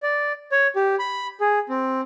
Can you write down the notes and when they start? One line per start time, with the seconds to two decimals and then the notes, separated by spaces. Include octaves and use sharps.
0.03 D5
0.52 C#5
0.76 G4
0.99 B5
1.40 G#4
1.69 C4